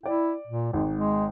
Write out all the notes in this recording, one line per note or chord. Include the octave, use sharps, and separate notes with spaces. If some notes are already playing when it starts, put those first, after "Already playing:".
E4 D5 G5
A#2
G#1 G#3
G#3